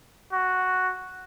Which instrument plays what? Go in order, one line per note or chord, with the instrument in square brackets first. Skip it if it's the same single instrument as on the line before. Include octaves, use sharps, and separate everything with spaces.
[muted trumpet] F#4